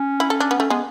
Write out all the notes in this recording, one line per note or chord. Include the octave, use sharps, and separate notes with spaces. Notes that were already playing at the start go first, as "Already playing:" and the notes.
Already playing: C#4
E4
A4
D4
B3
A3 C#4
G#3 B3